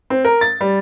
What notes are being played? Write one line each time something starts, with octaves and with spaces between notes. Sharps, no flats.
C4
A#4
A6
G3